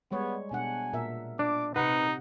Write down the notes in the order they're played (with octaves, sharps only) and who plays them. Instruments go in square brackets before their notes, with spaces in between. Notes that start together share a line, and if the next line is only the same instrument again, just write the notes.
[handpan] G3 G#3 C#5 [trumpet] B3
[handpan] B2 D4 F#5 [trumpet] G#5
[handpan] A#2 A#4 E5
[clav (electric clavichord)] D4 [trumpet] D6
[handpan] C3 F#5 [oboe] D#4 [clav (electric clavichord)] B4 [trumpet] A#5